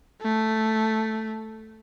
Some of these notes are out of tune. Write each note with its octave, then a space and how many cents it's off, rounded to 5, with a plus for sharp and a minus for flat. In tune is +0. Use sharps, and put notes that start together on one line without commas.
A3 +0